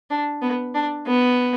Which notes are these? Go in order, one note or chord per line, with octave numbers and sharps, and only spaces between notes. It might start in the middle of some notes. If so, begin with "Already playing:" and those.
D4
B3
D4
B3